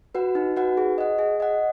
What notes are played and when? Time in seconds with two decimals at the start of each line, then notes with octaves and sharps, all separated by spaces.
0.15 F#4 B4 F#5
0.35 D#4
0.56 F#4 B4 F#5
0.77 G#4
0.98 D#5 F#5
1.19 G#4
1.40 D#5 F#5